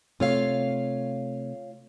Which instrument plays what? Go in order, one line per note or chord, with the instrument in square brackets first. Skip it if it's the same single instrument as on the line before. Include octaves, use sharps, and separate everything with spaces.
[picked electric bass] C3 A3 [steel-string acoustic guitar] F4 C#5 F5